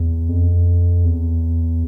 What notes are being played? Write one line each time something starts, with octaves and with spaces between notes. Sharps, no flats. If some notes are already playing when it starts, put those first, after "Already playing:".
Already playing: E2
F2
E2